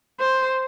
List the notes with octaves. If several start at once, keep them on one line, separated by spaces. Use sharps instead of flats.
C5